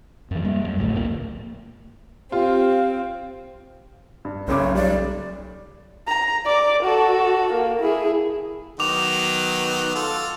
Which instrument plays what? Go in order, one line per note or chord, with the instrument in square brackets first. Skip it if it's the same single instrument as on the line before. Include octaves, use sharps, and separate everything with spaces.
[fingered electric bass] F#2 E3
G3 A#3
F#2
G#1 D2 A2
E1 A#1 A2 A#3
[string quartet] C4 [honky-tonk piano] F4 [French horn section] G4
[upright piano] G2
[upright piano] F#1 C#3 D6 [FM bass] B1 [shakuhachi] C#5
[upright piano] G3 [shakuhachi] D5
[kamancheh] A#5
D5 D6
F#4 A4
A#3
E4 G#4
[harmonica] D#3 F#3 B3 [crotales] D6 F7
[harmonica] F4 A4